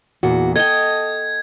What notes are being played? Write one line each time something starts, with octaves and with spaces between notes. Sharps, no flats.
E2 A#2 F#4
A4 D#5 G5 G#6